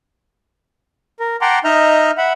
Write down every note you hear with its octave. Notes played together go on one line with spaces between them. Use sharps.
A#4
F#5 G5 A5 A#5 C6 D6
D#4 D#5 E5 A#5 F6 G6
E5 F#5 B5